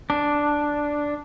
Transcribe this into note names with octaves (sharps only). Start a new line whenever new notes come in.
D4